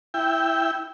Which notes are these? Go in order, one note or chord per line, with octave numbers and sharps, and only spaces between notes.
E4 G5